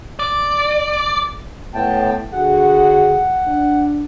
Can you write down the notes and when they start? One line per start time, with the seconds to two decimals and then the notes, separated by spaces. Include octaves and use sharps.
0.19 D5
1.74 A2 B3 G5 A5
2.33 D3 F#4 G#4 F#5
3.47 D4